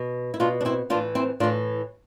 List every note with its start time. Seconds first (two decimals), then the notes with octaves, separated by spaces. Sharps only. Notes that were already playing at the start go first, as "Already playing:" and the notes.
Already playing: B2
0.34 E4
0.40 B2 D4 F4
0.61 D4
0.65 C4 E4
0.90 A2 E3 D4 F4
1.15 C4 E4
1.40 A2 D4 F4
1.43 E3